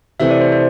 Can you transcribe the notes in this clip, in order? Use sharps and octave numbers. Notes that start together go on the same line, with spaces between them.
C3 E3 A3 E5
D5
C5
C5